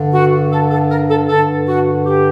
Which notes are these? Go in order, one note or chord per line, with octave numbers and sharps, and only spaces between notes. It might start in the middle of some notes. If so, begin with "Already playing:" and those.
Already playing: G2 D3
F#4
A4
A4
A#4
A4
G2 D3 A4
F#4
G4